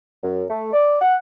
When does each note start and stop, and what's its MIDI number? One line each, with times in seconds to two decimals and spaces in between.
0.23 0.44 42
0.50 0.70 57
0.73 0.98 74
1.01 1.15 78